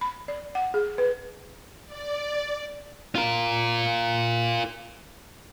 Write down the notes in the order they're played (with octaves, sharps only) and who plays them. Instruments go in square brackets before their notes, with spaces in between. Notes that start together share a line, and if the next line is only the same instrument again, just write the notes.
[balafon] B5
D5
F#5
G#4
B4
[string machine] D5
[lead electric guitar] F4 A#4